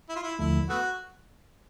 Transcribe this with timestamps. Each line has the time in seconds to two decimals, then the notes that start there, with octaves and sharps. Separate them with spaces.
0.09 E4
0.16 F4
0.23 E4
0.39 D#2 D3 F3 A3 E4
0.69 A3 B3 F#4